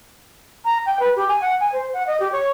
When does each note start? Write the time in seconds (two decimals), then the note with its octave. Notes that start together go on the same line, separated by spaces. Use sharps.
0.65 A#5
0.86 G5
0.99 B4
1.16 G4
1.28 G#5
1.41 F#5
1.60 G#5
1.72 C5
1.93 F#5
2.07 D#5
2.20 G4
2.32 C#5